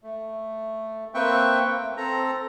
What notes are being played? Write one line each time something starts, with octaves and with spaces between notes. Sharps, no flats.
A3
A#3 C4 B4 E5 G5 C#6
A3
C4 A4 A#5